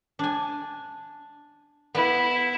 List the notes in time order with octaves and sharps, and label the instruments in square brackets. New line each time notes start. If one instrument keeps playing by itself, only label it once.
[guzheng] D4 G#5
[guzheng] B3 [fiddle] E4